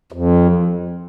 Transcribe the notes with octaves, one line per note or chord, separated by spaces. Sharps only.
F2